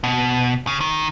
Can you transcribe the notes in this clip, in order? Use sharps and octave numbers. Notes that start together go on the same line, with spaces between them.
B2
C#3
D#3